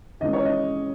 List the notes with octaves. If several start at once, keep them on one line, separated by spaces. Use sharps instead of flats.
D#2 C#3 E3 G#3 D#5
C#5
D#5